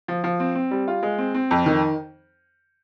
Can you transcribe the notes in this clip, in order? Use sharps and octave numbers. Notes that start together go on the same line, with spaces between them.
F3
F3
C4
C4
G3
F4
G#3
C4
C4
F2
D#3